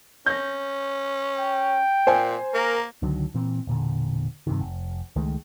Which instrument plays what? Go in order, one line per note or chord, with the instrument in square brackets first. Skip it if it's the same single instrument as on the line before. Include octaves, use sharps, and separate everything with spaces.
[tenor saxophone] C#4 [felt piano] G6 A#6
[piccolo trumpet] G5
[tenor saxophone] A#2 [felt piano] C5 G#5
[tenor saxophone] A#3 [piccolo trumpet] A#4
[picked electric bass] C#2 D3 D#3 F#3
A#2 E3 C4
E1 A#2 D3
G2 C3 D#3
F1
C#2 D#3 G#3 A3